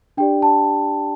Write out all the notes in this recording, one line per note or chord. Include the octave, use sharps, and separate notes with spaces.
D4 G4 D5 G5
A5